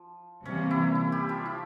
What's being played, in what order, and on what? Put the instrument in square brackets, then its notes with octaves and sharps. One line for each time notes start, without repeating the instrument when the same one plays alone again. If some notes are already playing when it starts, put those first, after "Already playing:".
Already playing: [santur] F3
[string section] C3 E3 G3 A#3 [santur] C#4
[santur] E4
E4
G3 G4
F3 F4
E4